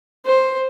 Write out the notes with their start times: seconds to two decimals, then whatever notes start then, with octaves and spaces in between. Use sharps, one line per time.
0.26 C5